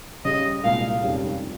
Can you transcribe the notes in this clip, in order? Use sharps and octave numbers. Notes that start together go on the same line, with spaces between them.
C#3 G3 C#4 D#5
C2 A#2 G#3 F5
F1 D#2 D#3 G3 C#4
F3